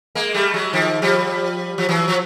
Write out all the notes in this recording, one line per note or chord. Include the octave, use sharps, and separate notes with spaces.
G#3 A#3
G3 A3
F#3 G#3
D#3 F3
F3 G3
F3
E3 F#3
F3